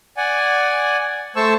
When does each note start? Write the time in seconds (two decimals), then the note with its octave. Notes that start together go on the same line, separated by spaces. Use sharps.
0.17 D5 F#5 G#5
1.36 A3 C5 A5 C#6 E6